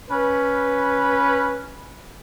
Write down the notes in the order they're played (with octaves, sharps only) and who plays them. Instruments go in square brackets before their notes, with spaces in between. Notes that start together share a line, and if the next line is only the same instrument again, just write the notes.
[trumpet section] C#4 B4